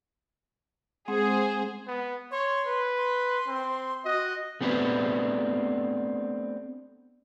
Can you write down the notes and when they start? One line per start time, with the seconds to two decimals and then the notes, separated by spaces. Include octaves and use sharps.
1.08 G#3 C4 G#4 C5 F#5
1.87 B3
2.32 C#5 C6
2.66 B4
2.97 C6
3.48 C4
4.05 F#4 D#5
4.61 A3 B3 C4 D4 G4 B4